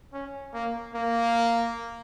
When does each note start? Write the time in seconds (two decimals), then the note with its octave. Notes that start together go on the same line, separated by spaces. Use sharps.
0.13 C#4
0.54 A#3
0.95 A#3